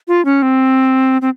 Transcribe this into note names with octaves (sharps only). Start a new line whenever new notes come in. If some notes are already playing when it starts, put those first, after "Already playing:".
F4
C#4
C4
C4